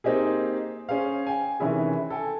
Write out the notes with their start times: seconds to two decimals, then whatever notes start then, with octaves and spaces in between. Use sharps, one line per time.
0.04 A#3 C4 D#4 G4 G#4
0.89 C#4 G#4 C5 F5
1.27 G5 G#5
1.60 C3 D#3 E3 C#4 E4 G#4
2.10 A4 G5 G#5